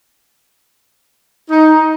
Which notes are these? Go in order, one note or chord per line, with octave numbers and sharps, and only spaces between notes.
D#4